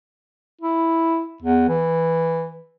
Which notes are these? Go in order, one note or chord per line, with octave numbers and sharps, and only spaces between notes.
E4
E2
E3